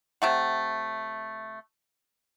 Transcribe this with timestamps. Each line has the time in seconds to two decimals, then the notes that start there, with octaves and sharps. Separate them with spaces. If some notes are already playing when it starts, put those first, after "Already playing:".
0.22 C3 A3 F#5